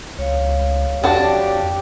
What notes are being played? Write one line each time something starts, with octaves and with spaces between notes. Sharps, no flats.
C#2 C#5 F5
F2 D4 F#4 G4 A5